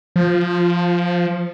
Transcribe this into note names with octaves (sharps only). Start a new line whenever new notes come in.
F3